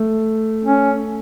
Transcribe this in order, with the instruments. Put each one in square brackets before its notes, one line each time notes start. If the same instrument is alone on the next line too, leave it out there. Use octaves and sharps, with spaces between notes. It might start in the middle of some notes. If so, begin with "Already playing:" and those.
Already playing: [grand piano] A3
[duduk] C#4